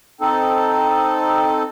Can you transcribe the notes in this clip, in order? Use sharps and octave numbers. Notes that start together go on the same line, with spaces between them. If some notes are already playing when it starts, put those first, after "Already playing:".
C4 D#4 A4